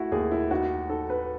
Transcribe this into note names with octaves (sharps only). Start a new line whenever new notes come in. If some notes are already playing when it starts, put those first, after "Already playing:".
Already playing: A3 E4 F#4
D#2 G#4
E4
D#4 F#4
D#4 A4
B4